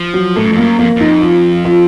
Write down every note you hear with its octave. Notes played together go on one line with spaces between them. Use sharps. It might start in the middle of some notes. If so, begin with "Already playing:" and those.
Already playing: F3
F#3
A2 A3
F#2
F2
F#2 A#3
F2 A#3
F2 D#4
F4
F4